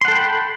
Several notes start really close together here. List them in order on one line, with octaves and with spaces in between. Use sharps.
C6 F#5 A4 G5 B5